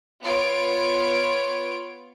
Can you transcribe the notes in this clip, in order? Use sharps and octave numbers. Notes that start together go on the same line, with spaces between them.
B3 F4 C#5 D7